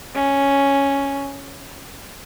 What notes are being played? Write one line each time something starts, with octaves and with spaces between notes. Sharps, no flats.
C#4